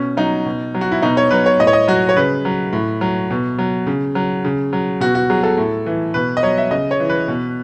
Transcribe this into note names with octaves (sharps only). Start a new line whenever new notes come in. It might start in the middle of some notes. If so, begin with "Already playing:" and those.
Already playing: B2 C#4
F#3 D#4
B2
F#3
F#4
E4
B2 D#4
C#5
F#3 B4
C#5
A2 D#5
C#5
D#5
F#3 F#4
C#5
C#3 B4
F#3
A2
F#3
B2
F#3
C#3
F#3
C#3
F#3
B2 F#4
F#4
F#3 G#4
A4
A2
E3
B2 B4
D#5
F#3 C#5
E5
C#3 D#5
C#5
E3
B4
B2